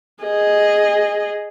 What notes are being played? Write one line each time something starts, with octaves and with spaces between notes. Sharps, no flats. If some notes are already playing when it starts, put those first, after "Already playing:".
G#4 D#5